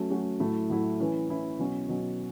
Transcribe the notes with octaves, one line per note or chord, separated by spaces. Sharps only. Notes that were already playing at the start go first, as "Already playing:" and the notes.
Already playing: F#3 A3 C#4 F#4
F#3 A3 C#4 F#4
A2 F#3 A3 E4
A2 F#3 A3 E4
E3 C#4 E4
E3 C#4 E4
B2 F#3 C#4
B2 F#3 C#4